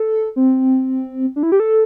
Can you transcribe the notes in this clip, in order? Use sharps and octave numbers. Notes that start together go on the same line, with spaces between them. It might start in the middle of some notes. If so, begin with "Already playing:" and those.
Already playing: A4
C4
D4
E4
G4
A4